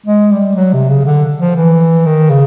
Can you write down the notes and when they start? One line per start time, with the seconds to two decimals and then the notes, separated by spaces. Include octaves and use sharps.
0.06 G#3
0.32 G3
0.56 F#3
0.73 C3
0.89 C#3
1.05 D3
1.39 F3
1.56 E3
2.06 D#3
2.30 C#3